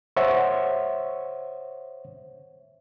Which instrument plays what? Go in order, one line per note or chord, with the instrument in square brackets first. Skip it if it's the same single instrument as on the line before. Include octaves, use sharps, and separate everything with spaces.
[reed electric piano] C5 C#5 E5 F#5